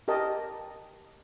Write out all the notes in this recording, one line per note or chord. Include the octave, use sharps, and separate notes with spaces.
G4 A#4 D#5 A5